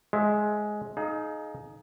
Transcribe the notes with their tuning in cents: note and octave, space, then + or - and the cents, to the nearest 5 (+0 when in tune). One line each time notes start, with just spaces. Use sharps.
G#3 +10 C5 +30 E5 +15
D#4 +0 G#4 +35 F5 +0